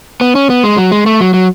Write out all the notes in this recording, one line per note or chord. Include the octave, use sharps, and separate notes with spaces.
B3
C#4
B3
G#3
F#3
G#3
A3
F#3
F#3